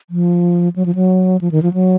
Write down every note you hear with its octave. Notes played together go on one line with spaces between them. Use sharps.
F3
F#3
F3
F#3
F3
D#3
F3
F#3